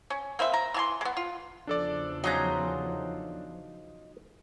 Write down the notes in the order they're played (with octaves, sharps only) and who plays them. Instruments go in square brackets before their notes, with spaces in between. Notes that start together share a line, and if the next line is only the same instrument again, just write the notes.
[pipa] C#4
A#3 C4 B4 E5
A#5
E3 G#5 C6
G#3 B3
F4
[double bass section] E2 C#3 F3 [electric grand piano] D4 A4 D5
[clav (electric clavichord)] F#3 C#4 [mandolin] D#4 F4 A#5